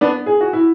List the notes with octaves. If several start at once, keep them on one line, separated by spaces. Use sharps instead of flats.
B3 D4
G#4
F#4
E4